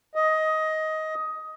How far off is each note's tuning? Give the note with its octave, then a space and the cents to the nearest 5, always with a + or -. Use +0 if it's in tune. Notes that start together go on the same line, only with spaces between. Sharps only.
D#5 +15